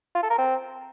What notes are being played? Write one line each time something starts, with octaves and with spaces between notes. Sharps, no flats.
F4
A4
A#4
C4